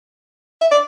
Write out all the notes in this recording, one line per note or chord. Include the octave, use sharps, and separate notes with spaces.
E5
D5